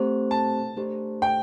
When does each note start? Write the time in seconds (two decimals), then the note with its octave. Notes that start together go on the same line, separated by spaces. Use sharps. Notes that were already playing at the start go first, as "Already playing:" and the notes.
Already playing: A3 C4 G4 C5
0.31 A5
0.77 A3 D4 G4 C5
1.22 G5